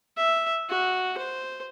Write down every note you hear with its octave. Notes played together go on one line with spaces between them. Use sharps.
E5
F#4
C5